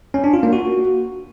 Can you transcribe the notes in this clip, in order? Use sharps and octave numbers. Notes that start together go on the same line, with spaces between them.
C#4
D4
F4
A#3
F#4